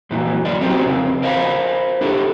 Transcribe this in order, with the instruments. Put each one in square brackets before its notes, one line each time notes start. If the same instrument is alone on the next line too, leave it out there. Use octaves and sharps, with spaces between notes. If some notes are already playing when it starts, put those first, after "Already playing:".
[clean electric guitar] F#2 A#2 E3 F#3
F#3 D5 D#5
C4 C#4 F#4 G4 A#4 C5
F2 C#3 C4
A#4 C5 D#5 F5 F#5 B5
D4 E4 G4 A4